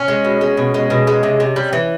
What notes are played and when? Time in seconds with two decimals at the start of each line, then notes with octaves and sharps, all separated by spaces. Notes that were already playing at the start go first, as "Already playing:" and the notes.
Already playing: C#4
0.08 G#3
0.25 B2
0.41 G#3
0.57 B2
0.74 G#3
0.90 B2
1.07 G#3
1.23 C3
1.40 C3
1.56 G3
1.73 E3